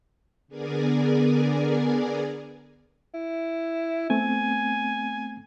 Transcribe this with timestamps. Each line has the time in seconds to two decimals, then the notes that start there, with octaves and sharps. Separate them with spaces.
0.48 D3 B3 G#4 A#4 D5 G#5
3.14 E4
4.10 A3 B3 C4 G#5